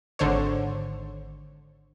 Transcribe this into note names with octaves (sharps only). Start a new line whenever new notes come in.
G#1 D3 C5 C#5